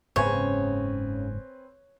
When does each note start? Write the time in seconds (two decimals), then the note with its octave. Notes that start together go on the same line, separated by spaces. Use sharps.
0.16 F#1 G#2 C#3 B3 C4 B4 C#5 G#5